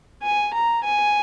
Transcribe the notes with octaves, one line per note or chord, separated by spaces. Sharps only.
G#5
A#5
G#5